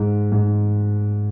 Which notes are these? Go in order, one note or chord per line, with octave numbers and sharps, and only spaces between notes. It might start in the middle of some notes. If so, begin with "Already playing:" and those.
Already playing: G#2
G#2